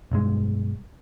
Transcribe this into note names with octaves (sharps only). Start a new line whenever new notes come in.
B1 G2 G#3